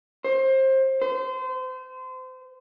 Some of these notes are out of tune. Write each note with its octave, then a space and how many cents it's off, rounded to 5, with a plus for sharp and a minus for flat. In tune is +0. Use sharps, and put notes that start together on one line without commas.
C5 +25
C5 -30